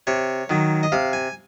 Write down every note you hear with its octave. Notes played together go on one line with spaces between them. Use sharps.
C3 C#5
D#3 F#3
D#5
C3 F5
G#5